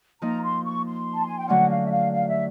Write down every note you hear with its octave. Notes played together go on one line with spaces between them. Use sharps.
F3 A#3 D#4 A#5
C6
C#6
C6
A5
G#5
G5
D3 F#3 A3 C#4 F#5
F5
E5
F5
F5
E5